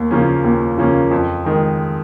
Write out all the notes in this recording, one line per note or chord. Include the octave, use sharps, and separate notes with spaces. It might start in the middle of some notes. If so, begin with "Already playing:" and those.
Already playing: D#2
C#3 F3 A#3 C#4
D#2
C#3 F3 A#3 C#4
F2
D#3 G#3